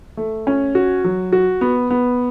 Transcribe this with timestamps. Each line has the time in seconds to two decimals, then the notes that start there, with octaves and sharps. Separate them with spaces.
0.17 A3
0.47 C#4
0.75 F#4
1.04 F#3
1.32 F#4
1.61 B3
1.91 B3